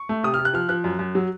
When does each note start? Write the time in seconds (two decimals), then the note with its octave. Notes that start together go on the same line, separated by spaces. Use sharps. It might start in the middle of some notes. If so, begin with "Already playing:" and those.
Already playing: C#6
0.09 A3
0.23 C3 D#6
0.34 F6
0.39 C3
0.45 F#6
0.53 F3 F6
0.69 F3 F#6
0.84 F#2
0.99 F#2
1.15 F#3